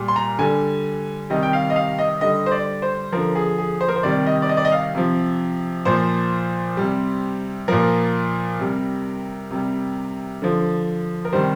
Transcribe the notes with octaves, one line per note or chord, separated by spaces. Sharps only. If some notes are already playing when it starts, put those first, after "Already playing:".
Already playing: A#2 G3
C6
A#5
D3 G3 G#5
C3 D#3 G3 D#5
G5
F5
D#5
F5
D#5
D3 G3 D#5
C5
D5
C5
D3 F3 A#4
G#4
G#4
C5
A#4
C5
C3 D#3 G3 D5
D#5
D5
D#5
D5
D#5
F5
C3 F3
A#2 F3 C5
C3 G3
A#2 F3 A#4
C3 G3
C3 G3
D3 F3
A#4
C3 D#3 G3 C5